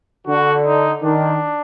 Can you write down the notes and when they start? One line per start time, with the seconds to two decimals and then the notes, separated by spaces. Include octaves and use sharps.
0.27 D3 F#4
0.66 D#4
1.03 D#3 D4